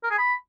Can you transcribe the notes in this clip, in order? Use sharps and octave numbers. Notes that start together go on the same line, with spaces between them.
A#4
G#4
B5